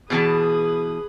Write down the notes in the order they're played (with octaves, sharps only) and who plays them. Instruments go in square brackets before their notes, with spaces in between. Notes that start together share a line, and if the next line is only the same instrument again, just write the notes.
[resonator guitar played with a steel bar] B2 E3 A5 [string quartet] G#4 B4 D#6